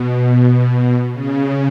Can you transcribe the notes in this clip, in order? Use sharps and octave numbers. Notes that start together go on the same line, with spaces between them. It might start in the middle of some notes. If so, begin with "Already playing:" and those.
Already playing: B2
C#3